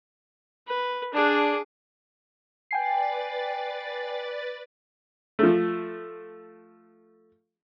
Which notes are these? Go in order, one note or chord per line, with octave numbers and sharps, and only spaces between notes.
B4
D4 G#4
B4 D5 G5 G#5 A6 C7
F3 A3